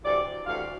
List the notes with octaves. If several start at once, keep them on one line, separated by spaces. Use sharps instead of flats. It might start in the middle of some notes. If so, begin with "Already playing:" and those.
D2 C3 E3 D5
D2 C3 E3 F5